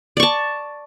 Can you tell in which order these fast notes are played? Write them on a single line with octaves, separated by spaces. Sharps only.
D5 C#6 A5